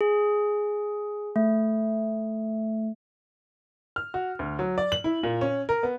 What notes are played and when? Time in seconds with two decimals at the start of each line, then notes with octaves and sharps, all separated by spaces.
0.01 G#4
1.36 A3
3.96 F6
4.14 F#4
4.39 D2
4.59 F#3
4.78 D5
4.92 F#7
5.04 E4
5.23 A#2
5.41 C#4
5.69 A#4
5.83 B3